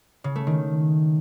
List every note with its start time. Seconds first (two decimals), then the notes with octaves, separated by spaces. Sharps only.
0.24 C#3
0.36 A3
0.47 D#3